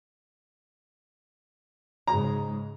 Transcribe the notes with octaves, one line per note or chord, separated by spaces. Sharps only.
G#2 C#3 G#3 A#5